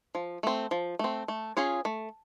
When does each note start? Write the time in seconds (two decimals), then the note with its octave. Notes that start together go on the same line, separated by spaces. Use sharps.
0.15 F3
0.43 A3 C4
0.71 F3
0.99 A3 C4
1.28 A3
1.57 C#4 F4 G#4 C#5
1.85 A3